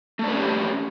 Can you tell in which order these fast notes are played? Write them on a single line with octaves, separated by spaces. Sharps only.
A3 D4 B4 C#4 G4